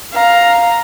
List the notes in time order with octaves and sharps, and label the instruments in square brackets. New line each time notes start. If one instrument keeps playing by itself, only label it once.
[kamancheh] F5 A#5